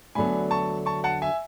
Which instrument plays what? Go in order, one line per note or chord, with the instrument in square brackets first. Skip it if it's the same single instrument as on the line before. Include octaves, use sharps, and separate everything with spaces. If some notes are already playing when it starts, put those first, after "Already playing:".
[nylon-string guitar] D2 D3 F#3 B3 [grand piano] G#5 B5
[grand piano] A5 C#6
A5 C#6
F#5 A5
E5 G#5